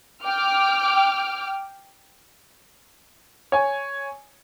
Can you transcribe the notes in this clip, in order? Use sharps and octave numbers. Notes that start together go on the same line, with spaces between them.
G5 D6 F6
C#5 G#5